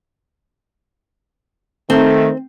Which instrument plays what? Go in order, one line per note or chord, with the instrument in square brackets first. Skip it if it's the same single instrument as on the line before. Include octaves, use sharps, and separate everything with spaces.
[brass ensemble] D#3 A3 [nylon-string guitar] C4